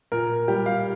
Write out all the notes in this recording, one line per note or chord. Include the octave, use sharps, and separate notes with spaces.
A#2 A#4
G3 G4
F5